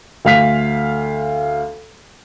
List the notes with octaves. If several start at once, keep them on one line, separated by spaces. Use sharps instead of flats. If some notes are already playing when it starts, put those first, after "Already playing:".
D2 F5 B6 F7